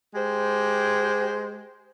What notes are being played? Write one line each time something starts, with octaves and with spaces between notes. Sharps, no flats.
G#3 G4 C5